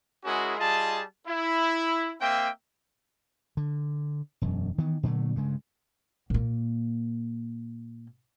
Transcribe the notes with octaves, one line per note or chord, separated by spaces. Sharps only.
G#3 C#4 E4 F#4 G#4 A#4
G3 F4 G#4 D#5 A5
E4
A#3 C4 E5 G5
D3
E1 F#2
D#3 E3 B3
A#2 D3 F#3 A3
G2 C#3 G#3
A#2 A#3